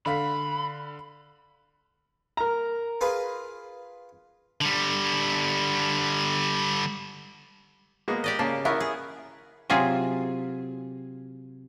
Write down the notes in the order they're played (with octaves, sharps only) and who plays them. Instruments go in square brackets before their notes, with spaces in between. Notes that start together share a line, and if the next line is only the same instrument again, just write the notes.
[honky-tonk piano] D3 F5 B6 [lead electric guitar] B5
[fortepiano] A#4 A#5
[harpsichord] F4 G#4 B4
[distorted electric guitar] D3 G3
[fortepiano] G#3 A#3 B3
[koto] G4 D5 D#5
[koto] C#3 [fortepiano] A#3 A5
[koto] B3 [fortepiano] E4 A#4 C#5
[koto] G#4
C3 F#3 F4 G#4